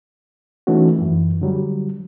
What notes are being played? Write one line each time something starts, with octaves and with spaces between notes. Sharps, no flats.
E3 A3 C#4 D#4 F#4
F#2 E3
D3 F#3 G3